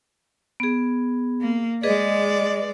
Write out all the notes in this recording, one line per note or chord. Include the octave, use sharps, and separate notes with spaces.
B3 G#4
A#3
G#3 G#4 B4 D5 D#5